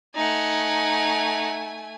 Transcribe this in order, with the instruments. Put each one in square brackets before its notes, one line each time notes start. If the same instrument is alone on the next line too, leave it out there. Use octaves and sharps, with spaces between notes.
[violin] A3 G#5 [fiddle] D#4 F#5